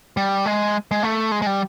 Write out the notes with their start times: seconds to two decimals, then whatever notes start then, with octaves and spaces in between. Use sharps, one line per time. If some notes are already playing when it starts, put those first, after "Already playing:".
0.17 G3
0.46 G#3
0.91 G#3
1.03 A3
1.32 G#3
1.42 G#3
1.47 G3